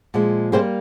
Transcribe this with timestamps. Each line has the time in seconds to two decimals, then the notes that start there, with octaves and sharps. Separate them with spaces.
0.14 A#2 F3 G#3
0.52 C3 G3 A#3 G#4 C5